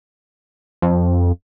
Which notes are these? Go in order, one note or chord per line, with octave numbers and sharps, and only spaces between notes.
F2